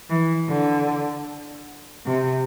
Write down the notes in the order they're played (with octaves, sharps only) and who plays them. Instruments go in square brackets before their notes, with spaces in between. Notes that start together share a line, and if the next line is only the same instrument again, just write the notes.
[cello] E3
D3
C3